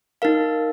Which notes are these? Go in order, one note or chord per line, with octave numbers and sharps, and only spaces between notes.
D#4 A#4 F5